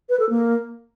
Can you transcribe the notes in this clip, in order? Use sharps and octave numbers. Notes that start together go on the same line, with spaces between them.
B4
A4
A#3